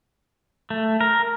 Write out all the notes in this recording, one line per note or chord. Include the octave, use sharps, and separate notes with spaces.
A3
A#4